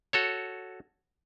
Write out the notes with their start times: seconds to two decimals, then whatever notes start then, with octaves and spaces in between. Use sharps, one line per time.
0.13 F#4 A4 C#5